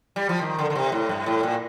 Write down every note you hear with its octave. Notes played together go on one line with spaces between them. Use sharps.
G3
F3
D#3
D3
D3
C3
A2
G2
A2
A#2